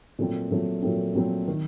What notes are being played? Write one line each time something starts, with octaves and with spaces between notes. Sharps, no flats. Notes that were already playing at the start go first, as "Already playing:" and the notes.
A#2 F#3 A3 C4
A#2 F#3 A3 C4
A#2 F#3 A3 C4
A#2 F#3 A3 C4
D#3